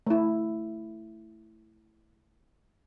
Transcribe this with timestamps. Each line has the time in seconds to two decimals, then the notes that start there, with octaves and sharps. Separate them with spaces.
0.07 A3 E4